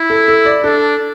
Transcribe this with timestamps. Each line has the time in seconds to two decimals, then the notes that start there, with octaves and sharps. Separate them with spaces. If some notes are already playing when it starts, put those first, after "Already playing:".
Already playing: E4
0.10 A4
0.28 A4
0.46 D5
0.64 D4 A4